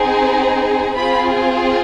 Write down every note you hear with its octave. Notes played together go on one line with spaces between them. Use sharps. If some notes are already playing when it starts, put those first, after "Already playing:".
Already playing: C4 D#4 G#4
C4 F4 G#4 B5